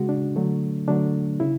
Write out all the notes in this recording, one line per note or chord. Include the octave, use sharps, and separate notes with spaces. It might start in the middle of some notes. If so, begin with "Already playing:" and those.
Already playing: C#3 G#3 F#4
D4
D3 F#3 A3
D3 F#3 A3 D4
C#3 E4